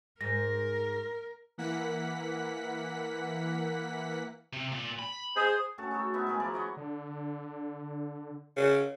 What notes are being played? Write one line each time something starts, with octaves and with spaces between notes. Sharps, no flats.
G#2 A#4 A#6
E3 A#3 F#5 B6
C3
A#2
B5
G#4 C5 D#6
A3 C#4 F#4 A4
D#4 F#4 A4 C#5
B3 D#4 E4 E5
G#3 D#4 G#4 A#4
F3 E4 A#4 D5
C#5 D#5 F#5
D3
C#3